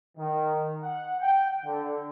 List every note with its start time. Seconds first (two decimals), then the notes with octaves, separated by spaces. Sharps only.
0.18 D#3
0.82 F#5
1.21 G5
1.65 D3